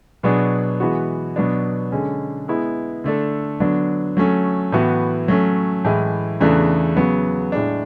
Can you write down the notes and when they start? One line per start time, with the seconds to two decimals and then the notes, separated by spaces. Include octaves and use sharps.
0.23 B2 F#3 B3 D4 G#4
0.80 E3 G#3 B3 F#4
1.36 B2 F#3 B3 D4
1.92 D3 G#3 C#4
2.48 G#3 B3 E4
3.04 D3 A3 D4 A4
3.60 D3 F#3 B3 D4
4.17 F#3 A3 C#4
4.72 A2 E3 B3 F#4
5.28 F#3 A3 C#4
5.85 A2 E3 G#3
6.40 E2 C#3 E3 A3 D4
6.97 C#3 F#3 B3
7.52 A2 G#3 D4